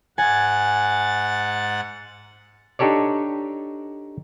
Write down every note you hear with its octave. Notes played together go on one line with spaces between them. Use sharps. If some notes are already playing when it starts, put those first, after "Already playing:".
G#2 F#5 G#5 A6
D4 D#4 G4 A4 C#5 D5